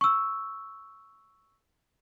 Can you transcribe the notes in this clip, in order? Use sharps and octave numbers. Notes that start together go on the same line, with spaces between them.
C#6 E6